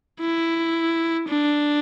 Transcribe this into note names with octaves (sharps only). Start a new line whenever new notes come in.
E4
D4